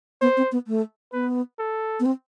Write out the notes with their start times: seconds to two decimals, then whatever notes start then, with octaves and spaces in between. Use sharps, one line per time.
0.21 B3 C5
0.37 C4
0.52 B3
0.67 A3
1.13 B3 B4
1.59 A4
2.00 B3
2.06 C4